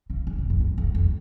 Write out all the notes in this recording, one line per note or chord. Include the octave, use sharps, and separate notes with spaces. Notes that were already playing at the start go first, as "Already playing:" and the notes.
C#3
D3
C#3
G2
F#2
F2
F2